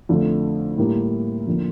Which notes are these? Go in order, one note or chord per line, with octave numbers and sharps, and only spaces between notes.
F2 D3 A3
A2 G3 A#3
F2 D3 F3 A#3